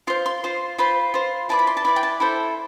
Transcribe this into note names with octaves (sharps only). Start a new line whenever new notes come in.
F4 C5 C6
C6
F4 C5
F4 C5 B5
F4 C5
E4 B4 D5 A5
B5
C6
A5
E4 B4 D5 B5
G5
A5
E4 A4 C5 G5